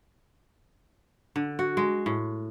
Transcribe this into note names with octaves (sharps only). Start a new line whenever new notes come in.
D3
F#4
G#3
A2